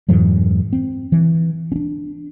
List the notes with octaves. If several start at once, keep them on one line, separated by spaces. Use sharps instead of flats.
F2 G#2 E3 F#3
C4
E3
C#4 D4